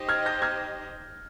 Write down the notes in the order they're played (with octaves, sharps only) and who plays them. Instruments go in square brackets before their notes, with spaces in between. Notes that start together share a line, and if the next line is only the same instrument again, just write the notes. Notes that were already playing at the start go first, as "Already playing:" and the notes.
Already playing: [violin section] D#4 G4 C5 D#5
[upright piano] F6 G#6
G6 A#6
F6 G#6